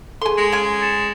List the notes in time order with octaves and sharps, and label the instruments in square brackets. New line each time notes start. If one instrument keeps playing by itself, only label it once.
[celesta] G#4 A4 [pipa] G#5 C6
[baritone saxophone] G#3
[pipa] C#4 G#5 [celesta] D7
[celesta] A6 C#7 E7